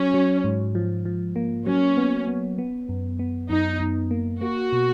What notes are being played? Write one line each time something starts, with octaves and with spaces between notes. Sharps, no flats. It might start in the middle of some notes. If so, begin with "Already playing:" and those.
Already playing: F#3 C#4
F#3
G#2
F3
F3
A#3
F#3 C#4
B3
B3
B3
F#2
B3
F#2 D#4
F#2
A#3
A#3 F#4
B2